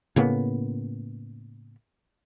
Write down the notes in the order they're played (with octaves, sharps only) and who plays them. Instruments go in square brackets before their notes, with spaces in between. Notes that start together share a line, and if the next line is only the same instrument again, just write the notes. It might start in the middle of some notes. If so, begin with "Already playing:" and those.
[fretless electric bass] A2 C#3 A#3 B3